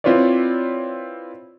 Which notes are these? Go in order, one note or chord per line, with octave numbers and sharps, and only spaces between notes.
C4 E4 F4 B4 C#5 D5